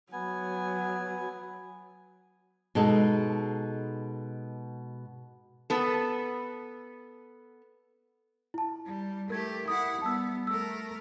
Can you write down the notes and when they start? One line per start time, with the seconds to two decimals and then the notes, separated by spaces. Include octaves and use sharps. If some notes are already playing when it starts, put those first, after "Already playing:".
0.12 F#3 B3 G#5
2.75 B2 G#3 D#4 A4
5.70 B3 A4
8.54 E4 A5
8.85 G3
9.30 A3 G4 A#4 G#6
9.68 E4 F#5 D#6
10.02 G3 B3 A5 E6
10.47 A3 A#4 E6